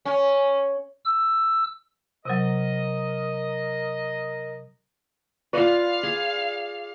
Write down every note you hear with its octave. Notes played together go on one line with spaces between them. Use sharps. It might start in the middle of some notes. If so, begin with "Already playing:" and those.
C#4
E6
C3 F#3 A#4 D#5
F4 B4 D5 F5
G#4